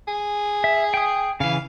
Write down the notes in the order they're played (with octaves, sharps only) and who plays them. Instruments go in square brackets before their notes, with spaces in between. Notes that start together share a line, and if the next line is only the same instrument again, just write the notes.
[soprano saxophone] G#4
[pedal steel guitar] E5
G5 D#6
[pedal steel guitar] C#3 E3 [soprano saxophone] F5